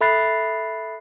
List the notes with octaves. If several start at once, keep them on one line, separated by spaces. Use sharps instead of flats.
A4 E5 B5 F#6 A6 C7